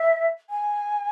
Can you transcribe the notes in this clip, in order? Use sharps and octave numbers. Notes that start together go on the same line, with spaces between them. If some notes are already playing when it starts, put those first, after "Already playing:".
Already playing: E5
G#5